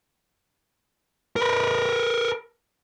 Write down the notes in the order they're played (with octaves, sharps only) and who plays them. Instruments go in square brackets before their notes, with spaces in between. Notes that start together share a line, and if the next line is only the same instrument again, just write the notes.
[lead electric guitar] A#4 B4